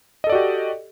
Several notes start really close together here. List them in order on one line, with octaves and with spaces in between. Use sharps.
D#5 A4 D5 F#4 G4